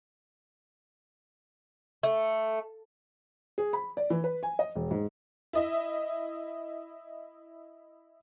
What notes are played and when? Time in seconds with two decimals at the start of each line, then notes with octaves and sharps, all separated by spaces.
2.03 A3
3.58 G#4
3.73 B5
3.97 D5
4.10 E3
4.24 B4
4.43 G#5
4.59 D#5
4.75 E1
4.91 G#2
5.53 E4 D#5 E5